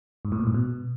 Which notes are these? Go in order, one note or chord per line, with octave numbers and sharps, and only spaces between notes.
G#2
A2
A#2
G#2
B2